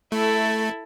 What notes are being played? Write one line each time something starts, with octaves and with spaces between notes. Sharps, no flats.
A3 E4 A4